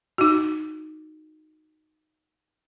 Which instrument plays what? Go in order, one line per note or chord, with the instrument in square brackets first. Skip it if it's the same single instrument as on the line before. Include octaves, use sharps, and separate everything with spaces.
[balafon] D#4 F#4